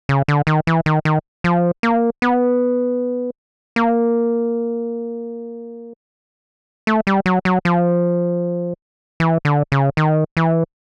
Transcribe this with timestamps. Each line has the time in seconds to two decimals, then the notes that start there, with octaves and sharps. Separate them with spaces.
0.09 C#3
0.28 D3
0.47 D#3
0.67 E3
0.86 D#3
1.05 D#3
1.44 F3
1.83 A#3
2.22 B3
3.76 A#3
6.87 A3
7.07 G3
7.26 F#3
7.45 F#3
7.65 F3
9.20 E3
9.45 D3
9.72 C#3
9.97 D#3
10.37 E3